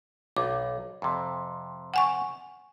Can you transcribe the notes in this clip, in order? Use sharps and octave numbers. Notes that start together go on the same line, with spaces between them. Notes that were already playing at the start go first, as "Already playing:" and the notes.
B1 D6
F2 C3
F#5 G#5 C#6